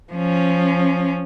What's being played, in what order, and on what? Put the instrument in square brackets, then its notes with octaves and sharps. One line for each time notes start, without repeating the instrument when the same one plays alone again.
[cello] F3 C#4